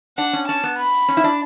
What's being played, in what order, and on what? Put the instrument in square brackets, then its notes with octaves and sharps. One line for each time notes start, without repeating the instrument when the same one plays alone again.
[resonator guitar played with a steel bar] D4 [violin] F#5
[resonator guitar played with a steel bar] C#4
[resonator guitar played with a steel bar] C#4 [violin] A5
[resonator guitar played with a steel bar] B3
[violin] B5
[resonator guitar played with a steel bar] C#4
E4
D4